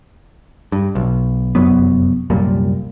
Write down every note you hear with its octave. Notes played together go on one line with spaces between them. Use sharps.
G2
B1
F1 F#2 F#3 B3
C2 F#2 A#2 G3